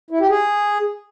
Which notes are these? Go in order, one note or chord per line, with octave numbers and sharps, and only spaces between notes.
E4
G4
G#4